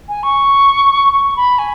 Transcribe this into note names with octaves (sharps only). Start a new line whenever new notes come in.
G#5
C#6
C#6
B5
G#5